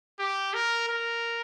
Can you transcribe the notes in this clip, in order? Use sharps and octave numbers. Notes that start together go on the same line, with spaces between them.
G4
A#4
A#4